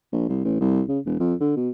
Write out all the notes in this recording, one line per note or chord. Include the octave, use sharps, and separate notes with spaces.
A#1
C2
A1
C2
C#3
E1
F2
D3
B2